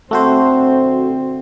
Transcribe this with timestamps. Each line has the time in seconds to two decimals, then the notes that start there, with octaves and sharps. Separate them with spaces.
0.11 D3 A3 C4 F#4 C5